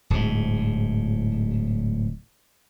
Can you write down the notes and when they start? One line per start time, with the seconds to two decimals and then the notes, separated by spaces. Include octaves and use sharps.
0.10 D1 G#2